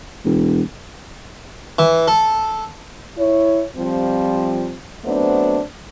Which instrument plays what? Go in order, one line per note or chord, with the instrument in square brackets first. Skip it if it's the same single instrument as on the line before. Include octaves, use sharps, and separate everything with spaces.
[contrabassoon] E1
[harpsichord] E3
A4
[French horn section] E4 C#5
F3 G3 C4
F#3 A3 B3 C4 D4 C5